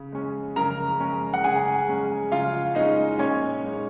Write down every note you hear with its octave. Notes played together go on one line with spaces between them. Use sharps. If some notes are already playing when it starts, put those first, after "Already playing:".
Already playing: C#3
G#3 C#4
C#3 A#4 A#5
G#3 C#4
F#5
C#3 G#4 G#5
G#3 C#4
C#3 F4 F5
G#3 C#4 D#4 D#5
A#2 C#4 C#5
G#3 D#4